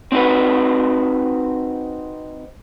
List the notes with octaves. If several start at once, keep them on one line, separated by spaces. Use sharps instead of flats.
C4 D#4 F#4 B4